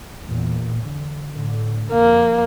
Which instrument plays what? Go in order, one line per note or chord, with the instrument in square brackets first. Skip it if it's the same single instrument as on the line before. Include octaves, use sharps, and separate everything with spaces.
[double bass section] E2 A#2
D3
A2 D3
[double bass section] F2 [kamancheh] A#3